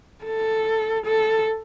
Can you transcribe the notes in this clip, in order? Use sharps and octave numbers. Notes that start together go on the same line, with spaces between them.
A4
A4